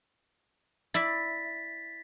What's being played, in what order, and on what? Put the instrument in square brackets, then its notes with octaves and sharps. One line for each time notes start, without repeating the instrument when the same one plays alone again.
[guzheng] E4 D5 E5 [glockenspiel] A6 B6